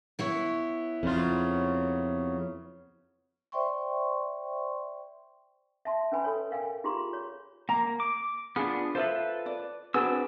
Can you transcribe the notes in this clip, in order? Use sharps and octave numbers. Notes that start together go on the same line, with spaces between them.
B3 E4 C#5
F2 C#3 F#3 F4
C5 D5 E5 G5 C6 C#6
E5 A5 C6
C#4 B4 G#5 B5
A4 C#5
A#4 F5 G5 G#5
F4 G4 G#4 A#5 C6
C#5 A#5
A#3 A#5
D6
B3 D4 F4 G#4
F4 A4 B4 C5 E5
D5
C4 D4 F#4 G#4 B4 E6